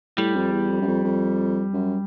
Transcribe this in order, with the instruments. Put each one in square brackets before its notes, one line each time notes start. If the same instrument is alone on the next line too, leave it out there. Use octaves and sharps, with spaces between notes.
[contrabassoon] A2 [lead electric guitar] G3
[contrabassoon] F2
E2
F2
F#2
F2
F2
F#2